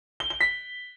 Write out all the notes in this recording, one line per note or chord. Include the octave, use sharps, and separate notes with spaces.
G7
G7
B6